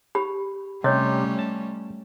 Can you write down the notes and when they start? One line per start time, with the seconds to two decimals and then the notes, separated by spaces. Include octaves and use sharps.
0.15 G4 B5
0.84 C3 G3 A3 C#4 C#5 D#5
1.39 A5